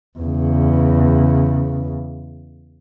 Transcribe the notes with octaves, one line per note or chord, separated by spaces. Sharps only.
E2 C#3